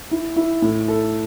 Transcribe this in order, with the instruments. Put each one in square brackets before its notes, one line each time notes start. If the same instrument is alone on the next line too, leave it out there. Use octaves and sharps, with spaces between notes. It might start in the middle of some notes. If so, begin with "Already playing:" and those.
[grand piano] E4
E4
A2
A4